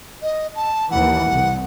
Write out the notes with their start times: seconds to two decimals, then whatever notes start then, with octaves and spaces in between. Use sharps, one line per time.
0.22 D#5
0.55 A5
0.91 D#2 E3 F#5
1.29 C2